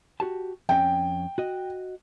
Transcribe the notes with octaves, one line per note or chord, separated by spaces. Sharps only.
F#4 G4 A5
F2 C#4 G5
F#4 D#5